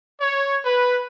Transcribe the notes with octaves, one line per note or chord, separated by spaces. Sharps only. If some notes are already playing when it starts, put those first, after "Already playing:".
C#5
B4